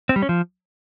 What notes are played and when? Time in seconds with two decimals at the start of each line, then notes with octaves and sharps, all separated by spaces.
0.09 C4
0.16 G3
0.22 C#4
0.29 F3